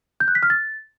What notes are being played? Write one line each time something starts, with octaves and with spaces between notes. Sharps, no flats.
G6
F#6
B6
F6
A6